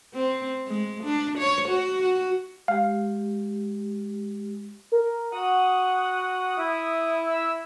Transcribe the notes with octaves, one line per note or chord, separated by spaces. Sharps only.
C4
G#3
D4
C#5
F#4
F#4
G#3 G4 F5
A#4
F#4 F#5 D#6
E4
E6